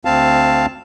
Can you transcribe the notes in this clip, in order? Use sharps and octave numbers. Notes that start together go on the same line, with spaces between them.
D2 C4 F5 A5